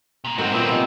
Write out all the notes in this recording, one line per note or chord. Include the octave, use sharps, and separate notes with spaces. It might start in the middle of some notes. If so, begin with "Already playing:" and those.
C3 A#3
G#2 F#3 A3 C4 F#4 A#4 C#5
A#2 F#3 B3 C4 D#4 F4 E5
C3 F3 G#3 F4